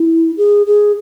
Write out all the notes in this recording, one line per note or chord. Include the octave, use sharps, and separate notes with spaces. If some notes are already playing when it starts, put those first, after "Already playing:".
Already playing: E4
G#4
G#4